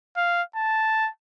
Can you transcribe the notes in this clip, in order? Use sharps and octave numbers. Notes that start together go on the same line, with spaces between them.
F5
A5